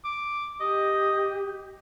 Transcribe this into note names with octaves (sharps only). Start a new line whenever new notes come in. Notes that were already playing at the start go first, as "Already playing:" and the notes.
D6
G4 D#5